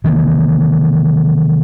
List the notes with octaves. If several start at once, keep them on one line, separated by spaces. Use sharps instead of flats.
C3 D#3 E3 A#3